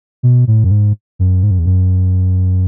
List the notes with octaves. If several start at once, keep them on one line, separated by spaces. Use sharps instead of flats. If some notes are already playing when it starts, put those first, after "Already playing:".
B2
A2
F#2
G#2
F#2
G#2
F#2
E2
F#2